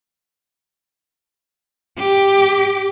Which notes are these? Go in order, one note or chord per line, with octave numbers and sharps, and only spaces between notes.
G4